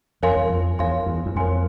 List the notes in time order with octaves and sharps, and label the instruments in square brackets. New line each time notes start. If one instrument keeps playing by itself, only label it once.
[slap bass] F2 [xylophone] A#4 C#5 F5 G#5 C6
[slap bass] E2
F2
[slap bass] E2 [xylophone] A#4 C#5 F5 G#5 C6
[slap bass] E2
E2
[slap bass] F2 [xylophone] A#4 C#5 F5 G#5 C6